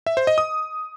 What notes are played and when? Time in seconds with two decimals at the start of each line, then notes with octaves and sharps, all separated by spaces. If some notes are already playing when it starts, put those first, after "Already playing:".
0.06 E5
0.17 C5
0.27 D#5
0.38 D#6